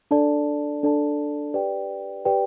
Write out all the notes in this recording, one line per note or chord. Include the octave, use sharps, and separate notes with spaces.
D4 A4 D5 A5
D4 A4 D5 A5
G4 B4 D5 G5
G4 B4 D5 G5